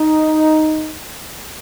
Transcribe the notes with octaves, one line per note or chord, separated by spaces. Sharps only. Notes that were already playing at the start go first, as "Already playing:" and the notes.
Already playing: D#4